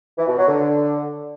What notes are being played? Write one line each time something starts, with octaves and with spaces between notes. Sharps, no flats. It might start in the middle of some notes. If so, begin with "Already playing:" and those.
E3
B2
F#3
D3